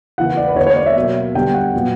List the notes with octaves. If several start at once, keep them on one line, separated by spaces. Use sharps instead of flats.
C#3 E3 A#3 F#5
D5
B4
D3 A#3 C#5
C#5
D5
E5
B2 F#3 A#3
D3 G3 B3 G5
F#5
A#2 F#3 B3